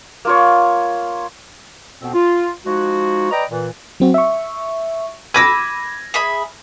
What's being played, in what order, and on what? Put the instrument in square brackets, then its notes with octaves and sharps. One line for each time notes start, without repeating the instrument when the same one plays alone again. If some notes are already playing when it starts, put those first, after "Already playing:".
[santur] A#3 F4 C#5
[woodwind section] F2 B2 B3 C4
F4
F3 G#3 D#4 F#4
B4 D5 D#5 G5 A#5
A#2 E3
[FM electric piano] F#3 C4 F#4
E5 C#6
[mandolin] B5 D6 E6 [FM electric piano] G#6 [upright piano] A#6 D#7
[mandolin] G#4 E5 B5